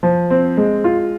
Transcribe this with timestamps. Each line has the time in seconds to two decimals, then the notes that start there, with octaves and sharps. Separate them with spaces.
0.03 F3
0.30 C4
0.57 G#3
0.84 F4